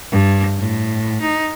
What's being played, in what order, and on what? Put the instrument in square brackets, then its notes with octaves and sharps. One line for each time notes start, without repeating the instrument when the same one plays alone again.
[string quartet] G2
A2
D#4